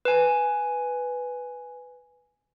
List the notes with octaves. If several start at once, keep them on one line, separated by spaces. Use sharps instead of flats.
B4 G#5